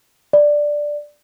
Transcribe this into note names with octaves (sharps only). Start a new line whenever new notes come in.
D5